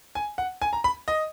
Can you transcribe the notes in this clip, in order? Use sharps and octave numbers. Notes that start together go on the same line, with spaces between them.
G#5
F#5
G#5
A#5
B5
D#5